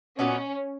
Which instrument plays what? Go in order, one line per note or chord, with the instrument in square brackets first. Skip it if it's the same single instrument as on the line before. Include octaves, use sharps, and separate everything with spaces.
[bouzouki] A#2 F#3 B3 D#4 [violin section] C#4